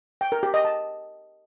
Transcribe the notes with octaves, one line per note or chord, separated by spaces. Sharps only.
G5
A#4
G4
D#5
A5